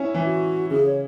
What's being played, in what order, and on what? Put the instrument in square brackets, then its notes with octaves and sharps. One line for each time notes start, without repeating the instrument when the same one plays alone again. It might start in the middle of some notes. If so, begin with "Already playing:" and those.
Already playing: [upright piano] C#4 E4
E3
[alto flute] F#4
[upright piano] C#3 [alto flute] G#4
[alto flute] C#5